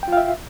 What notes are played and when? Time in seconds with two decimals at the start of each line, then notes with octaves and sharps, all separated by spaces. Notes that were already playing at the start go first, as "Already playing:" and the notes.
0.03 G5
0.08 F4
0.13 F5
0.17 E5